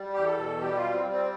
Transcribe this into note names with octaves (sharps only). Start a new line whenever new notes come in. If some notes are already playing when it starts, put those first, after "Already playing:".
Already playing: G3
E2 G4
A4
B2
G3 G4
F4
G3
C4
G3
C4